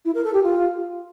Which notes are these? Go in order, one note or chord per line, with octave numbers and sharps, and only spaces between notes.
E4
A#4
A4
G4
F4